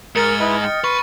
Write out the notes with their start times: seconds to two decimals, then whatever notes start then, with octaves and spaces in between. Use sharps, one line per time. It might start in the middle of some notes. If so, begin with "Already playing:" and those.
0.15 G#2 A#4 F6 A6 C#7
0.40 E4 B4 D#5
0.63 G5
0.84 B4 C6 C#6